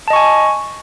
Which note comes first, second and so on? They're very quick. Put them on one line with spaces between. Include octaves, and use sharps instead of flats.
A5 D#5 C#6 G#5